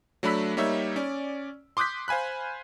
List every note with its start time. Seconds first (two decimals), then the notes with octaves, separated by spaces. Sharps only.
0.23 F#3 A3 D4 B5 E6 B6
0.57 G3 A#3 D#4 C#5 E5
0.96 C#4 D5
1.77 C6 D6 D#6 F#6 G6 B6
2.08 C5 F5 G#5 B5 F#6